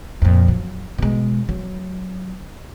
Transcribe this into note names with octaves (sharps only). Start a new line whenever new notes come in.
F2 A#2
F#3
B2 G#3
F#3